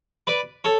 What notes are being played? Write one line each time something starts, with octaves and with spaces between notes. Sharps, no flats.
B4 D5
A4 C#5